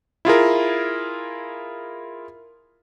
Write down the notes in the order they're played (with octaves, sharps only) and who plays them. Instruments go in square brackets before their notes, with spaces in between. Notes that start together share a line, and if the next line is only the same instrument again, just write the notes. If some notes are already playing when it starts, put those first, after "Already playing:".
[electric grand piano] E4 F4 G#4 A#4